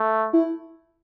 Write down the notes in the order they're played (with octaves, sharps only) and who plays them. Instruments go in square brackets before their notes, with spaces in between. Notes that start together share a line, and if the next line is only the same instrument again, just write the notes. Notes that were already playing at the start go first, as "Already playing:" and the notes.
Already playing: [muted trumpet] A3
[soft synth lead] E4